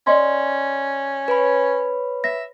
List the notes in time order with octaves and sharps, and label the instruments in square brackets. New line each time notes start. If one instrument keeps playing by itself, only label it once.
[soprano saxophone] C#4 [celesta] D5 D#5 C6
[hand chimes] B4 C#5 B5
[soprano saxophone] E5 [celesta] A#6